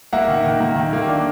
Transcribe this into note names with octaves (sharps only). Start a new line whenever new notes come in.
A#3 E5 F#5
D#3
D#3
A#3
D#3
A#3
D4